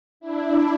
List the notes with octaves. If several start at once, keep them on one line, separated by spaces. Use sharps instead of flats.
D4 E4